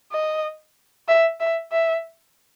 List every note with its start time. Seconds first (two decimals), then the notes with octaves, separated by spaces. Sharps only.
0.12 D#5
1.08 E5
1.40 E5
1.72 E5